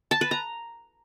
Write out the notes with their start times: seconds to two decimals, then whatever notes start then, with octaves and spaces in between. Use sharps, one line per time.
0.11 A5
0.21 B4
0.31 A#5